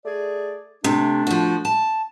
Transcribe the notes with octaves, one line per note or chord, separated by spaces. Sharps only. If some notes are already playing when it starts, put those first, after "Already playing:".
A3 G#4 D5
C3 A3 D4
F3 F#4
A5